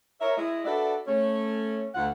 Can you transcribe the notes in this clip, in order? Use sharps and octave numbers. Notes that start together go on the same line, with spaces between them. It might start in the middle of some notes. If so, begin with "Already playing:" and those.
A#4 C#5 E5
G#3 E4 D#5
D4 F#4 A4 B4 D5 E5
A3 C#4 C#5
D2 F4 F#5